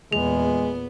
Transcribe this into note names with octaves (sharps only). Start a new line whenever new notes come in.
E2 A#2 G#3 B3 G#4